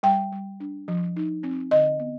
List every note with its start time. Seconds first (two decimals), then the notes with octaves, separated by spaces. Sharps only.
0.03 G3 G5
0.32 G3
0.60 D4
0.88 F3
1.16 D#4
1.43 C4
1.71 D3 D#5
1.99 B3